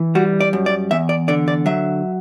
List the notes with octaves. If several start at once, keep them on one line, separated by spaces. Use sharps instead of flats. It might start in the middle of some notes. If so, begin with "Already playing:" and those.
Already playing: E3
G3 F#4
D5
F#2
D5
E2 E5
D5
D3 D5
D5
F#3 E5